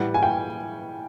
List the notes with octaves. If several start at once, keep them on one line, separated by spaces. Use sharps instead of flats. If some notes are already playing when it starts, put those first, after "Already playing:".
Already playing: A2 E3 G3 F#5
G#5
G5